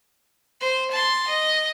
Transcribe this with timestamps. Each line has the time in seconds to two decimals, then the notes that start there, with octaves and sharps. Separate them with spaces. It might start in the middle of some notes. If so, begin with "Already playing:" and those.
0.60 C5
0.91 A5 C6
1.27 D#5